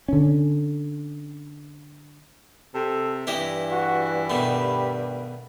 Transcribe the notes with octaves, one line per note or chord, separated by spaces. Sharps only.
D3 C#4
C3 A4
G2 E3 E4 G4 D#5
F#4
B2 D#3 A3 G4 B5